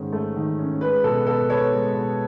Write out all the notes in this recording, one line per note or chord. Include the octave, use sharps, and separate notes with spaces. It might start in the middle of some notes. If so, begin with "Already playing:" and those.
Already playing: G#2 D#3 C#4
A3
D#3
C#4
G#3 B4
B2 A4
B2 A4
B3 A4 C#5
G#3
B2